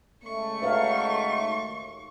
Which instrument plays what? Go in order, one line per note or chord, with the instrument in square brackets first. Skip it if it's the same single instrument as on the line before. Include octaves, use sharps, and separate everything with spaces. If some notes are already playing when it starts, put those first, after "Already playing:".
[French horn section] C#3 G#3 A3 [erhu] C#6
[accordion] D#4 F#4 [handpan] B4 C#5 F5
[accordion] D#2